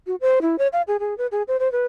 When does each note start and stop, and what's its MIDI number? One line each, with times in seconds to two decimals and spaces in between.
0.07 0.15 66
0.21 0.39 72
0.42 0.58 64
0.58 0.67 73
0.73 0.82 77
0.88 0.97 68
1.00 1.16 68
1.18 1.27 71
1.32 1.42 68
1.48 1.57 72
1.59 1.71 72
1.72 1.86 71